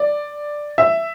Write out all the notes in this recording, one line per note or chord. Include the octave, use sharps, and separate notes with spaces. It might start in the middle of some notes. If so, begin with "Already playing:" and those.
Already playing: D5
E5